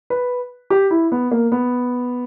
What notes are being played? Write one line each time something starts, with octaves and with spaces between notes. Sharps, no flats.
B4
G4
E4
B3
A#3
B3